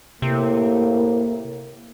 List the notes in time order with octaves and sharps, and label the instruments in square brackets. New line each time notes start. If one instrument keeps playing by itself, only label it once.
[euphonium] A2 [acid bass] C3 [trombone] A#3